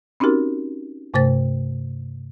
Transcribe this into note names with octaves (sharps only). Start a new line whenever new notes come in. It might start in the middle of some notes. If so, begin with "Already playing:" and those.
C4 C#4 D#4 F#4 G4 A#4
G2 C3 A3 C5 A6